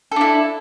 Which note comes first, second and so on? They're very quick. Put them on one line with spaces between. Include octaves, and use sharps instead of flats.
A4 D4 E4